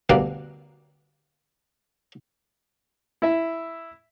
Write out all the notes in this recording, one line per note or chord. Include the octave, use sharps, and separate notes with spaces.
D2 B2 G3 A#3
E4 E5